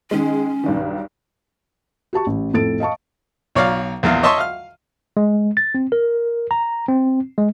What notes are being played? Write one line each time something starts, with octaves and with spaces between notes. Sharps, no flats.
D#3 G#3 C#4
B1 G2 D#3
F#4 G4 A5 C#6
A1
F2 A2 A4 A6 D7
D#5 F5 A5 C#6
B1 C#5 D5 F5 A#5
A#1 E2 F5
C#5 D#5 E5 A5 C6 C#6
F5 F6
G#3
A6
C4
A#4
A#5
C4
G#3